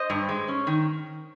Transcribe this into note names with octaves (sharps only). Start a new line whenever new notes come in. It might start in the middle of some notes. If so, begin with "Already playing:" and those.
Already playing: C5 D#5
G2
G#3
C#4
D#3